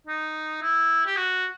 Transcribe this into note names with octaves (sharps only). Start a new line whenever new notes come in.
D#4
E4
G4
F#4